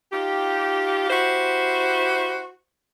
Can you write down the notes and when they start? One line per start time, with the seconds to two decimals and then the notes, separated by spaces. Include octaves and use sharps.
0.12 D#4 F4 G4
1.10 E4 F#4 G4 C5